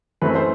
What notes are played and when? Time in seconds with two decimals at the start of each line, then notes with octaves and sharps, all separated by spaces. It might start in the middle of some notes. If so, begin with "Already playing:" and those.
0.22 F#2 E3 A3 C4 B4
0.35 C5